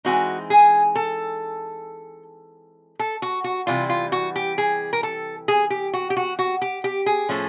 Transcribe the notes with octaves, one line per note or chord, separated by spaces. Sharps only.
E3 G#3 C4 D#4 F#4
G#4
A4
A4
F#4
F#4
C3 E3 G3 F4
F4
F#4
G4
G#4
A#4
A4
G#4
G4
F#4
G4
F#4
F#4
G4
G4
G#4
A2 F3 A3 C#4